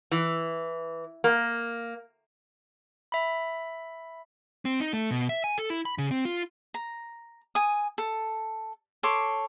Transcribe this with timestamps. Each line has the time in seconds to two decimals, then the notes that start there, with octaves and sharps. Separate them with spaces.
0.11 E3
1.24 A#3
3.12 E5 B5
4.65 C4
4.80 D#4
4.93 A3
5.11 B2
5.29 E5
5.44 G#5
5.58 A4
5.70 E4
5.85 B5
5.98 C#3
6.11 C4
6.25 F4
6.74 A#5
7.55 G#5 D#6
7.98 A4
9.03 A4 C#5 C6 D6